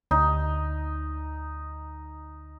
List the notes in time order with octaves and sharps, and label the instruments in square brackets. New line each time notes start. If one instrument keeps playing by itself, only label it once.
[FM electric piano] D2 [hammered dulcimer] D#4